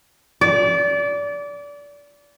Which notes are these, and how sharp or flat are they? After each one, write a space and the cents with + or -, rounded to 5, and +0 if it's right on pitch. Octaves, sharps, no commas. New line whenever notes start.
D5 -25